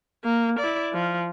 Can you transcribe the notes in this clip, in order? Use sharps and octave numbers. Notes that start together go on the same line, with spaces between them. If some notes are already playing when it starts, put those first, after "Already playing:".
A#3
E4 D5
F3